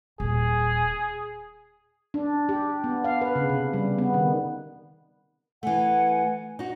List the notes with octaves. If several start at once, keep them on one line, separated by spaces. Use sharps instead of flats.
D#1 G#4
D4
G4
B3
F5
B4
C#3
C3
G3
B3
D#3
E3 A3 F#5 G#5
D#4 F#4